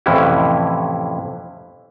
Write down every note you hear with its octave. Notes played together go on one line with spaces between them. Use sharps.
F2 A2 C3 E3 C#4 E4